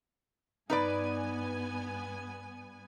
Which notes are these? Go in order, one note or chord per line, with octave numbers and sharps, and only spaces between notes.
G2 B3 D#4 B4 D5 G#5